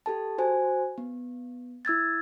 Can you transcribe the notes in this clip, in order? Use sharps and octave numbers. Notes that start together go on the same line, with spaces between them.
G4 A4 A5
F#4 C5 G#5
B3
E4 E6 G#6 A6